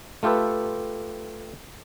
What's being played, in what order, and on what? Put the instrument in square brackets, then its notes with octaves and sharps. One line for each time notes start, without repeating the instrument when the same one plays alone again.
[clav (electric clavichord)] A3 F4 G4 A4 B4